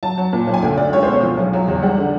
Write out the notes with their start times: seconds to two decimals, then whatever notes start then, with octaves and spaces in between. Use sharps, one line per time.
0.03 F#3 A5
0.18 F#3
0.33 A#2
0.47 B1
0.54 G#5
0.62 D2 G5
0.77 D2 D5
0.93 C#2 C#5
1.03 B2 C5
1.13 C#5
1.23 F3
1.37 B1
1.53 F#3
1.68 E2
1.82 G3 F#5
1.98 D3